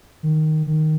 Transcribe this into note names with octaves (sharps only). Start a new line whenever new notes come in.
D#3
D#3